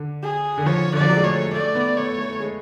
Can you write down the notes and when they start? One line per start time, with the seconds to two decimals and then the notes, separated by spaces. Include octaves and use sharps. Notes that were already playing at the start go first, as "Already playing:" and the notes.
Already playing: D3
0.23 G#4
0.58 D3
0.66 F3 C#5
0.93 D3 D5
1.01 F3
1.09 F#3
1.16 G#3
1.24 A3 C#5
1.53 A3 D5
1.75 B3
1.96 A3 C#5
2.18 A3
2.40 G#3